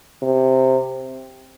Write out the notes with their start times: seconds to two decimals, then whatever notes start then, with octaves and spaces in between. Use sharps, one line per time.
0.23 C3